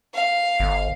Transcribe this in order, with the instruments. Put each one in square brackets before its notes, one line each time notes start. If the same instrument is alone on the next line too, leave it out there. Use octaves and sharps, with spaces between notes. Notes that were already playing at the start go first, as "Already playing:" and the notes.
[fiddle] F5
[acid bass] G1